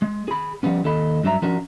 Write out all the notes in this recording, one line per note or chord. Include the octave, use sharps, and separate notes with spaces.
G#3
G#4 B5
F3 G3 B3 C#4
D#2 A4 D#5 B5
G2 F#3 D4 E5 A#5
F3 C#4 D4 F#4 A#4